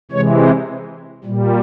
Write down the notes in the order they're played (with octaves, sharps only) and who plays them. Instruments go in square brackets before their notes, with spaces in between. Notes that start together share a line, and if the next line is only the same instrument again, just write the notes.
[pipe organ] C3 E3 G#3 C#5
C5
A#2 G3